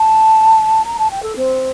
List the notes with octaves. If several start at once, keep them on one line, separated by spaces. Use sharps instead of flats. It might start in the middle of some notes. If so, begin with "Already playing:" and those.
Already playing: A5
A#5
A5
G5
A4
C4